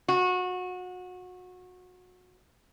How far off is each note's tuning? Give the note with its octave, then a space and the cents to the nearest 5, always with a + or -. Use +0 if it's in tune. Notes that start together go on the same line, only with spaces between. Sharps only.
F#4 -25